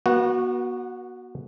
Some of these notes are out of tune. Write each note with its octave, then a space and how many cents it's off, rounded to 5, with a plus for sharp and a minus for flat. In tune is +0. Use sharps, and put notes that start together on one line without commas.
B3 -40 F#4 +0